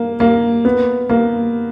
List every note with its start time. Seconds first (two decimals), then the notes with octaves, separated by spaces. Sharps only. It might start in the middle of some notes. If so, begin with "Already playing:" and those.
Already playing: A#3
0.20 A#3
0.65 B3
1.09 A#3